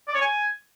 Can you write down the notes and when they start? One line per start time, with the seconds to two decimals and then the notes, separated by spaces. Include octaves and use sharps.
0.08 D5
0.15 C#5
0.21 G#5